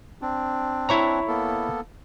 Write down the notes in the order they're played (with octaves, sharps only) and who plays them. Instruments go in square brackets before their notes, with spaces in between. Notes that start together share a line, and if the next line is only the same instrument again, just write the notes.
[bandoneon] C4 D4
[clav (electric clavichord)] E4 C#5 A#5
[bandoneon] A#3 B3 A4